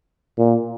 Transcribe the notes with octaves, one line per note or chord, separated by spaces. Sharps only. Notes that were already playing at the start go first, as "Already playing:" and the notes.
A#2